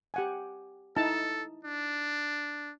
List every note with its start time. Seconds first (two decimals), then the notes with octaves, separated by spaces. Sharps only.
0.14 G4 F#5 G#5
0.96 D#4 E4 A4 A5
1.65 D4